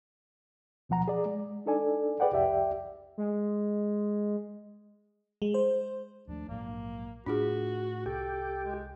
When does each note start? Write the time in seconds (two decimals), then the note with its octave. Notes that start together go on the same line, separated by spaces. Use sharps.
0.89 D2 B2 F3 F#5 A#5
1.08 G#4 D5
1.26 G#3
1.66 D4 D#4 A4 D5 G#5
2.20 G#4 B4 D5 F#5 G5
2.32 C2 F2 G4 D5 E5 G5
3.18 G#3
5.42 G#3
5.54 C5
6.28 D#2 F3 A3 D4
6.49 A#1 G#2 F#3 A#3
7.26 A2 D4 F4 F#4 G#4
8.06 C2 G4 A4
8.64 G#3